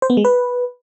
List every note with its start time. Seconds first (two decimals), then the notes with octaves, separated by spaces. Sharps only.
0.02 C5
0.10 B3
0.17 G#3
0.25 B4